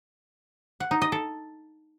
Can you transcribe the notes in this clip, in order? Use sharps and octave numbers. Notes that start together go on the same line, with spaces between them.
F#5
D#4
D#5
A4